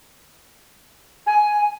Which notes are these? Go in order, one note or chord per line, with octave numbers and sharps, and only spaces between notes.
G#5